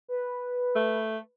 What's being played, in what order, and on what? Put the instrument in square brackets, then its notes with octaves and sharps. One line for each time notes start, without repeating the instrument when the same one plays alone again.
[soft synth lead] B4
[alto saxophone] A3